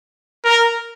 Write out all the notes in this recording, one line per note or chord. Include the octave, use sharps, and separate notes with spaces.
A#4